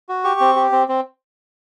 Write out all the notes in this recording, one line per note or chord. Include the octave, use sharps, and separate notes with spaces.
F#4
G4 C#6
C4
G4
C4
C4